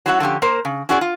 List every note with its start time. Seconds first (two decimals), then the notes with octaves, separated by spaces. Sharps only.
0.06 F#3 C#4 E4 F#4 F5 F#5
0.20 D3 F3 C#4 G4
0.42 A#3 A#4 C5
0.65 C#3
0.89 C#4 E4 F#4 G#4 A#4 D5
1.01 F4